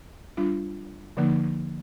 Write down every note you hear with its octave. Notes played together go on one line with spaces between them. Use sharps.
G3 D4 F4
D3 F3 A#3 D#4